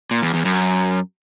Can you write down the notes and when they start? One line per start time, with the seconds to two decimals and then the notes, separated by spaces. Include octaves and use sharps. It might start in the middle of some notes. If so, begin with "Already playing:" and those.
0.11 A#2
0.22 E2
0.34 E2
0.45 F#2